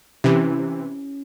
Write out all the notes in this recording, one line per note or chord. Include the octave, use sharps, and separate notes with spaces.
C3 E3 C#4 E4 G4 E5